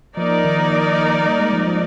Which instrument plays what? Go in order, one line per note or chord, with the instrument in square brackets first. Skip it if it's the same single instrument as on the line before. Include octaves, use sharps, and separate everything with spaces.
[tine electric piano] F3 [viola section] A#3 D#4 A#4 D5
[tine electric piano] F3
D#3
F3
G3
G#3
F3
F3